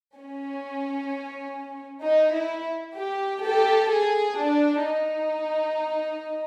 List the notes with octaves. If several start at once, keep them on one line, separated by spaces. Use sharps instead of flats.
C#4
D#4
E4
G4
G4 A4
G#4
D4
D#4